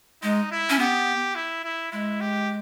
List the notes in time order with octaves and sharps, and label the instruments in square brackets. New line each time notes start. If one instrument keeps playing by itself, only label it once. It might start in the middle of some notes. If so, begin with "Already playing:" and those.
[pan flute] G#3 [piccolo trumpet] D#4
[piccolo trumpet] E4
[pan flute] C#4
[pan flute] B3 [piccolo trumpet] G4
[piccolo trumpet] E4
E4
[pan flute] G#3 [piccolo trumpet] E4
[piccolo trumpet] G4